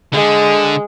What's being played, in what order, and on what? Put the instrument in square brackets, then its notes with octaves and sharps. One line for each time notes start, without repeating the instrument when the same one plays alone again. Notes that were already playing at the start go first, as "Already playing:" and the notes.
[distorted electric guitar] D3 [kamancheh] G#3